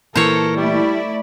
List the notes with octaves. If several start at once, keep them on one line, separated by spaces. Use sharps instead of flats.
A#2 E3 A4 A#4 C5 C#5
G3 A3 E4 D5